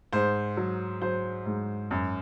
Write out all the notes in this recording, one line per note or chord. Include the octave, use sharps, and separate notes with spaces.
G#2 C5
F#3
F#3 C5
G#2
F#2